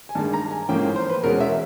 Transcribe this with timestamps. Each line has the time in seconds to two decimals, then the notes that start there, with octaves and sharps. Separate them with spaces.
0.09 G#5
0.15 G2 D#3 G#3 A5
0.34 A#5
0.51 G#5
0.69 A1 G#2 F3 A#3 C#4 G5
0.96 C5
1.10 B4
1.23 E2 B2 G#3 C#4 A#4
1.41 E5